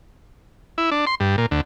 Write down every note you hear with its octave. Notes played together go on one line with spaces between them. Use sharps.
E4
D4
C6
G2
A#2
D2